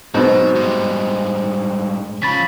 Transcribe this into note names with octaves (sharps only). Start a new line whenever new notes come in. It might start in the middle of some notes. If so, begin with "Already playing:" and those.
G#2 B2 F#3 C5
G2 G#3
C#3 F3 B5 A6 B6